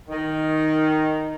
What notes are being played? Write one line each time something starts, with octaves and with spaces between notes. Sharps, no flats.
D#3